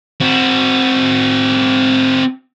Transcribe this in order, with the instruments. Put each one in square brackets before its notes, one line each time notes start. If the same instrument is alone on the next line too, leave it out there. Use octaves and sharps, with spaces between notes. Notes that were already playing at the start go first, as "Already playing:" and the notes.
[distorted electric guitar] C4 F#4